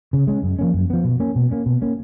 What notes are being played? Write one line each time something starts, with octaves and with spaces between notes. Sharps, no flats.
C#3
G#3 C#4
F#2
F3 A#3 C#4
F#2
F3 B3
B2
A#3 C#4
B2
A#3 C#4
B2
A#3 C#4